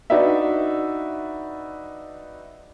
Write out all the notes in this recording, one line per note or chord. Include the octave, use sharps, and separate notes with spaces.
D4 D#4 F#4 B4 D5 E5